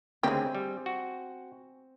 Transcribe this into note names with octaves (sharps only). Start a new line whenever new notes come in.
D2 C#3 G#3 C4 G4 G#5
G3
F#4